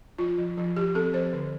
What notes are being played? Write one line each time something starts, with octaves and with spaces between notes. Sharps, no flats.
F3 F4
F3
F3
F3 G4
C4 A4
F3 C5
D3